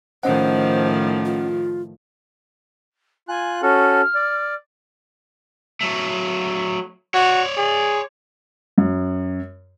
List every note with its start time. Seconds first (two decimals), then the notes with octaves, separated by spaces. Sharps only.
0.23 A2 D#3 F3 C#4 C5 D#5 F#5
1.25 F4
3.28 F4 G#5 F#6
3.62 C#4 F#4 A4 F6
4.15 D5
5.81 F#3 A3
7.14 F#4 C#5 D5
7.57 G#4
8.78 F#2